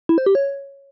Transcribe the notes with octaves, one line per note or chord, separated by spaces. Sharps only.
E4
C5
G4
C#5